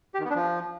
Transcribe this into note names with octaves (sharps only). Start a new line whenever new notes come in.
G4
D#3
B3
D4
F3